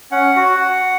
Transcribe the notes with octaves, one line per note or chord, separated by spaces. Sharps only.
C#4 F#5
F#4